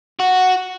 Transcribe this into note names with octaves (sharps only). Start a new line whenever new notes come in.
F#4